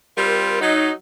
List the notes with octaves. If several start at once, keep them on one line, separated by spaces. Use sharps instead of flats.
G3 C4 F4 A#4
F#3 D#4